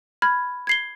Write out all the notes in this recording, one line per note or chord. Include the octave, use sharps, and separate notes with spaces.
B5 F6 G#6
G#6 C7 G7